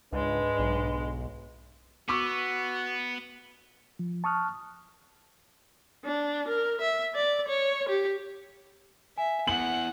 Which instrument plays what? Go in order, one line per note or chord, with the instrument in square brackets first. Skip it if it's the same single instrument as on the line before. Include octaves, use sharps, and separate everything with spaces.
[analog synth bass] C#2 [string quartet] G#2 G#3 [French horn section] D4 B4
[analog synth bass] B1
[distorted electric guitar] B3 [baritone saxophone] F#4 [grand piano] C#6 D6 E6
[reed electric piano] F3
A5 C#6 D#6 F6 F#6
[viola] D4
A#4
E5
D5
C#5
G4
[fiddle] E5 [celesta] G#5
[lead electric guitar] B3 E4 [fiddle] F#5 [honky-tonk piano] F#7